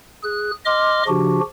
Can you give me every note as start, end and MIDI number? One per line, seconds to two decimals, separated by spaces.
0.23 0.51 68
0.23 0.51 90
0.65 1.03 75
0.65 1.03 84
0.65 1.03 86
0.65 1.03 89
1.08 1.40 49
1.08 1.40 53
1.08 1.40 62
1.08 1.40 66
1.08 1.40 67